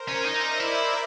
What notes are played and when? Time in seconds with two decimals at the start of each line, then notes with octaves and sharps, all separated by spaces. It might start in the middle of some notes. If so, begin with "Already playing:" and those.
Already playing: A#4 C5
0.08 C#4
0.26 D#4 D5 E5
0.60 E4